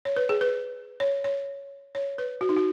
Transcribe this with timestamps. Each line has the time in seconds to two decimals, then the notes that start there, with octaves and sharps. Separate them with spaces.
0.05 C#5
0.16 B4
0.29 G#4
0.41 B4
1.00 C#5
1.24 C#5
1.95 C#5
2.18 B4
2.41 F#4
2.49 D#4
2.57 F#4